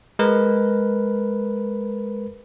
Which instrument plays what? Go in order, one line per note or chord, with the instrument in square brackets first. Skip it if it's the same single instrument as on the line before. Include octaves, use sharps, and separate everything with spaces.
[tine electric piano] G#3 A#4 B4